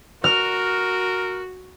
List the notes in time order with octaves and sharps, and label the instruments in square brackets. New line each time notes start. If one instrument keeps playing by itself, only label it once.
[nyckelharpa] F#4 [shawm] A#4 [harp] F6